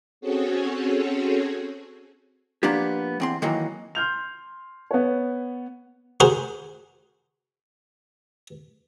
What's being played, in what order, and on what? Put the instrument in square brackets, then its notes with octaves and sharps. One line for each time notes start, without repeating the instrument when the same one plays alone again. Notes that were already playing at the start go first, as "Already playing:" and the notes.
[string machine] C4 C#4 F#4 G#4 A4 C#5
[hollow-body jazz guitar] F3 A#3 B3 D4 G4
E2 C4 C6
D#3 E3 F#3 A#3
[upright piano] C6 F6 G6 F7
B3 B4 C#5
[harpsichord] F#4 G#4 A#4 C5